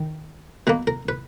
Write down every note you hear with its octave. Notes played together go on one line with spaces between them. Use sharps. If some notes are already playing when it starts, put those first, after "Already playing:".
Already playing: D#3
B2 A#3 B4
A#4
B4